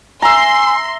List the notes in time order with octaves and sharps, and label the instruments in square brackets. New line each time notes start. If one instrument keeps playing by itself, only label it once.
[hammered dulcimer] E5 A#5 [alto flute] G#5 [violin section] C6